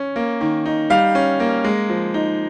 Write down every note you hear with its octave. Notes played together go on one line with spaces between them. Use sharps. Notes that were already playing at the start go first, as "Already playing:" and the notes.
Already playing: C#4
A#3
D#3
D#4
G3 F5
C#4
A#3
G#3
F3
D#4